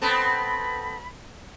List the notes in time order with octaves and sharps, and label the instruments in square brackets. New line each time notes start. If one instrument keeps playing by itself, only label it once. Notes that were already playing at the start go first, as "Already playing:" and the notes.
[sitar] B3 C4 A4 [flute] B5